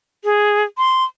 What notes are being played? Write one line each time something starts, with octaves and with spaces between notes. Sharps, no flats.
G#4
C6